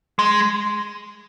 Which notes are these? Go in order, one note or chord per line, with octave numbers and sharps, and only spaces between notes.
G#3